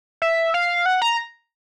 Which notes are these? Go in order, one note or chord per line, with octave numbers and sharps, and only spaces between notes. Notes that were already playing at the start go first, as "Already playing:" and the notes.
E5
F5
F#5
A#5